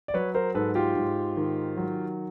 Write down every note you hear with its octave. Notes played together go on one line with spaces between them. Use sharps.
D5
F#3 B4 C#5
A#4 C5
G#2 A4 B4
F4 G4
G#2
D#3
F#3